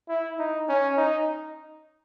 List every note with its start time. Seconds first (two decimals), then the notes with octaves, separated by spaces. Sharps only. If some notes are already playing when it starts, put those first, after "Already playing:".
0.08 E4
0.39 D#4
0.69 C#4
0.97 D#4